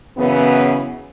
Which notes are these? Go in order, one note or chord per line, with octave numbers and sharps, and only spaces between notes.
F#2 C#3 E3 B3